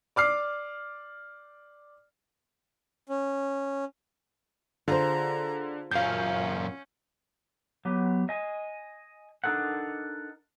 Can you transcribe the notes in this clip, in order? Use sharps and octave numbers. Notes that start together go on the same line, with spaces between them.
D5 D6 F6 C7
C#4
D3 F4 G#4 C5 A#5
F#2 A#2 C#4 F5 G6
F#3 B3 G4
D#5 G#5
D4 D#4 A4 A#4 F#5